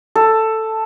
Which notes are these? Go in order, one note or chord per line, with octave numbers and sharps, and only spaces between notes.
A4